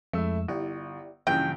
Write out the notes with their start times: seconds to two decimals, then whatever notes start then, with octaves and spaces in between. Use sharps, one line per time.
0.13 F2 G#3 A3 E4 E6
0.48 G1 E4 G4 D5
1.27 A#1 G2 C#3 E3 G5